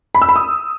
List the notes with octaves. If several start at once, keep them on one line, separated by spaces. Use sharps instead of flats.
B5
E6
B5
D#6